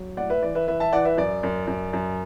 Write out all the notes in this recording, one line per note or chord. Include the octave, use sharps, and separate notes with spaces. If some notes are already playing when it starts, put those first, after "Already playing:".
Already playing: F#3
A2 D5 F#5
B4 E5
E3 D5
B4 E5
E3 B4 E5
E5 A5
E3 D5 F#5
B4 E5
F#2 D5
F#2
F#2
F#2